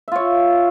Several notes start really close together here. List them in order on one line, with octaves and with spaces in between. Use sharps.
E5 F4 C#5